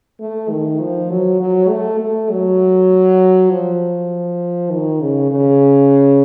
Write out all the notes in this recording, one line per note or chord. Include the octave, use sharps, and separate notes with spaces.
A3
D#3
F3
F#3
F#3
A3
A3
F#3
F3
D#3
C#3
C#3